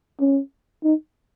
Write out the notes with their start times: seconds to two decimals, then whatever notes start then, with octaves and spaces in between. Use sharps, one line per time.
0.21 C#4
0.84 D#4